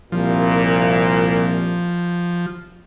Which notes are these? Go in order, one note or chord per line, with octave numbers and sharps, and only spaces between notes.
C2 A#2 F3